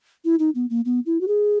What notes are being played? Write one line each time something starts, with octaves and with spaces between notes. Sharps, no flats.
E4
D#4
B3
A#3
B3
E4
F#4
G#4